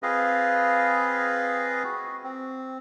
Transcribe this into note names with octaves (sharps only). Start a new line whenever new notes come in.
C4 F4 G#4 B4 D#5 F5
F#4
C4